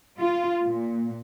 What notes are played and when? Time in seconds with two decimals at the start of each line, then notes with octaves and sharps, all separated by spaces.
0.20 F4
0.63 A#2